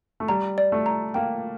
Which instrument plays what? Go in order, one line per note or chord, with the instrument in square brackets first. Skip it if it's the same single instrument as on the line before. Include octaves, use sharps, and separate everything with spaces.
[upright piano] A3
[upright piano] G3 [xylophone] A#5
[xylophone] D5
[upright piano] A3
[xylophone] A#5
[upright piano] A#3 [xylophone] G5